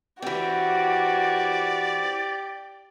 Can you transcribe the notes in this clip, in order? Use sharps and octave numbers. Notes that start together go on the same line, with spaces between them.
E3 C4 F#4 G4 D5